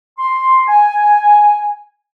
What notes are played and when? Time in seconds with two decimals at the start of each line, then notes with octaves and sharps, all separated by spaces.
0.18 C6
0.68 G#5